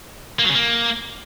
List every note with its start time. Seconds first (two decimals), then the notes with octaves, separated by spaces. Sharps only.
0.39 A#3
0.44 F#3
0.50 C#3
0.55 A#3